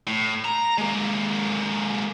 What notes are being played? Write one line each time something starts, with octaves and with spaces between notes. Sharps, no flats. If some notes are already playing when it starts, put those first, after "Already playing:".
A2
A#5
G#3 A#3